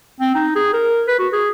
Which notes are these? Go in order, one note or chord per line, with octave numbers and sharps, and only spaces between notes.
C4
D#4
G#4
A#4
B4
F#4
G#4